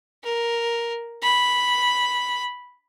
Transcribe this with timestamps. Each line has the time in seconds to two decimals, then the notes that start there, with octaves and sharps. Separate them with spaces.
0.23 A#4
1.23 B5